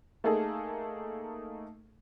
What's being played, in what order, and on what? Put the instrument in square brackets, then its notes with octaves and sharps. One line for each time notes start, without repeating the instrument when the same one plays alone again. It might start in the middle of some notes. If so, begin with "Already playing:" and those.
[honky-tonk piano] A3 A#3 D#4 G#4 A4